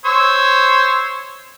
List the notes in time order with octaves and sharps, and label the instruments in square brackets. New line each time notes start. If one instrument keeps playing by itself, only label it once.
[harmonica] C5 C#5 E6